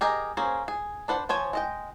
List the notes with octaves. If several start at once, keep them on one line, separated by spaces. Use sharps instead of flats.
G4 G#4 A#4 D#5
A#3 C#4 G#4 C5
G#4
D4 B4 C5 F#5
F3 C5 C#5 G#5
G#3 D#5 G5